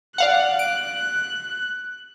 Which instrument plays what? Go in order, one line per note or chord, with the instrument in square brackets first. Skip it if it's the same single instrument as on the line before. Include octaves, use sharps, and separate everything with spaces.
[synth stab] D5 F5 F#5 [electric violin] F#6
[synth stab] D7